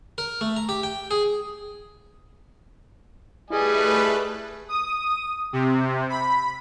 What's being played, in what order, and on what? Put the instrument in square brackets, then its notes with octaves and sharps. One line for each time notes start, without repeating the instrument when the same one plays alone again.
[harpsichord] A#4
A3
A#5
G4
G5
G#4
[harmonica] G3 D#5 G#5 [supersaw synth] A3 B4 [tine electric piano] E4 G#4
[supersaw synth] D#6
C3
B5